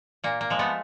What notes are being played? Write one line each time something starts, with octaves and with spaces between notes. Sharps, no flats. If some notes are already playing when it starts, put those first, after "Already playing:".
A#2 A#3
A#3
F3 G#3
A3 B3